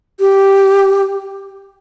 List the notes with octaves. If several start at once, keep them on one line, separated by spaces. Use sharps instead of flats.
G4